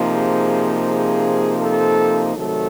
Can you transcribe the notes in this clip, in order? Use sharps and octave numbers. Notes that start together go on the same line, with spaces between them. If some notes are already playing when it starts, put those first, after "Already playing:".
Already playing: C3 F3 A#3 D#4
G#4
G#4
A4
C3 D#3 F#3 A3 A4